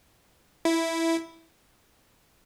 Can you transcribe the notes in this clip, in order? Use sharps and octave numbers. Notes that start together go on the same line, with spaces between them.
E4